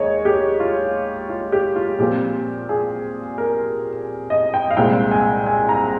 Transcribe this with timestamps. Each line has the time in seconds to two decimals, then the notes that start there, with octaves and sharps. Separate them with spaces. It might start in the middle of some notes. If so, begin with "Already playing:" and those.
Already playing: D#2 G#3 C#5 D#5
0.25 G4
0.60 F4
1.29 F4
1.52 G4
1.75 F4
1.99 A#2 F3 C4 G4
2.69 G#4
3.38 A#4
4.30 D#5
4.54 G5
4.71 F5
4.77 C2 A#2 G#3 C4 G5
5.11 G#5
5.46 G#5
5.69 A#5